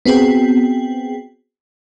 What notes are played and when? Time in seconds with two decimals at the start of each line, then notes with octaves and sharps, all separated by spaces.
0.06 B3 C4 F#4 G#4 G5